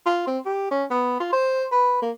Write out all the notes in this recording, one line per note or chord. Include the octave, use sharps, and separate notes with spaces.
F4
C4
G4
C#4
B3
F4
C5
B4
A#3